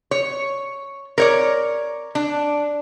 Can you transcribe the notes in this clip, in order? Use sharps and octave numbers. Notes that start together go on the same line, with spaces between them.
C#5
A#4 C#5 D5
D4